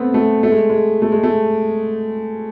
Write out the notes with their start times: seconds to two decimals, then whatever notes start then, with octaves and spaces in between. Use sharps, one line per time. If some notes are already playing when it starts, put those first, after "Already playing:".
Already playing: A3 B3 C4
0.14 A3
0.43 A3
0.52 G#3
0.69 G#3
1.02 A3
1.12 G#3
1.24 A3